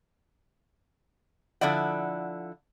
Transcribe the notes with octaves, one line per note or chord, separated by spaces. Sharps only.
D3 F3 E4 D5 F#5